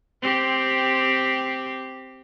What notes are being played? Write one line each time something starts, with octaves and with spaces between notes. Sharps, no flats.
C4 G4